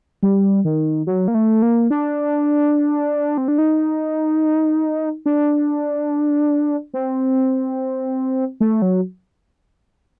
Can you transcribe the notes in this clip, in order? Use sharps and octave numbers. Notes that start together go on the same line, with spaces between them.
G3
D#3
F#3
A#3
A3
A#3
D4
C4
D4
D#4
D4
C4
A3
F#3